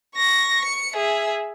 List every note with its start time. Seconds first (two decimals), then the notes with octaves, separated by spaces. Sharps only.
0.16 C#6 A#6
0.64 C#7
0.94 G#4 E5